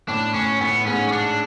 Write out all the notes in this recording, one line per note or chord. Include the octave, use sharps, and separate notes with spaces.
A2 D4
A2 C#4
A2 B3
G#2 C#4
C#4
D4